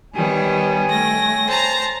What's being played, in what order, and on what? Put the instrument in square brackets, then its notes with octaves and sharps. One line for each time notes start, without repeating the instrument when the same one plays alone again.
[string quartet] D#3 G3 B3 [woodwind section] C#5 G5 G#5
[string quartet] A3 A#6
C5 A5 A#5